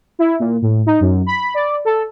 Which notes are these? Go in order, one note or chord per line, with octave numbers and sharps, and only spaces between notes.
E4
A#2
A2
D#4
F#2
B5
D5
A4